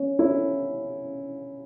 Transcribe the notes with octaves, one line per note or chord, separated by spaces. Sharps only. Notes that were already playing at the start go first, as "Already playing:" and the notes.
Already playing: C#4
C#4 E4